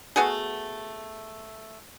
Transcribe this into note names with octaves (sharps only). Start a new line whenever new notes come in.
A3 B3 F#4 G#4